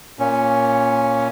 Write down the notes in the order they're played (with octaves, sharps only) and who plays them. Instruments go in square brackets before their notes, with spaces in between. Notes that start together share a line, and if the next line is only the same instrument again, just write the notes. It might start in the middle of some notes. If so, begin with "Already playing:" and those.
[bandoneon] A#2 C#4